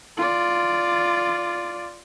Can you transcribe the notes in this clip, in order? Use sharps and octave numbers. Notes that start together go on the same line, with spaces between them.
F4 D5